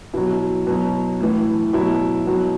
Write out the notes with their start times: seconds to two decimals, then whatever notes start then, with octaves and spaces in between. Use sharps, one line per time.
0.14 B2 F#3 E4
0.67 B2 F#3
1.20 A2 E3
1.73 B2 F#3 E4
2.27 B2 F#3